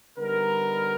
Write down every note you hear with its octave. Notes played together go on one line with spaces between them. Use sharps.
D3 G3 B3 D#4 A#4